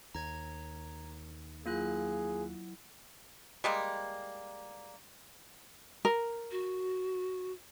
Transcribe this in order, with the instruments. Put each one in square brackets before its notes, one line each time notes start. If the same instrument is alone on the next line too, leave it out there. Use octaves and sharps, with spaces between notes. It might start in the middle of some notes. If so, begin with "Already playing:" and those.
[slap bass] D#2 [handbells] A#5 G#6
[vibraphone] F#3 E4 [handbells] A#3 F4 F#6 [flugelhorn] G#4
[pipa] G3 G#3 A#3
[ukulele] A#4
[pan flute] F#4